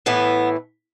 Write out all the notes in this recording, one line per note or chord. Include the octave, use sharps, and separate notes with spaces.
A2 E3 A3 B3